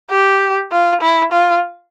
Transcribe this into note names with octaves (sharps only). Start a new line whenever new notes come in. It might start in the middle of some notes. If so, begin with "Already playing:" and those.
G4
F4
E4
F4